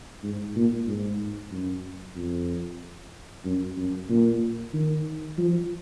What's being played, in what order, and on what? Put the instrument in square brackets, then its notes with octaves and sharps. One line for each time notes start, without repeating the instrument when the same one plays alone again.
[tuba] G#2
A#2
G#2
F#2
F2
F#2
F#2
A#2
D#3
F3